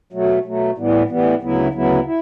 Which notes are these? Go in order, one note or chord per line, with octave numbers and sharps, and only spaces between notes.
B2 F#3 A3
B2 F#3 A3
A2 E3 G3 B3
A2 E3 G3 B3
D2 C#3 F#3 B3 E4
D2 C#3 F#3 B3 E4
E4